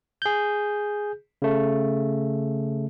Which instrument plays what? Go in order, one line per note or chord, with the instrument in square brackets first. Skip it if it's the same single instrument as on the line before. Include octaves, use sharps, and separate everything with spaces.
[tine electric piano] G#4 G6
C#3 A3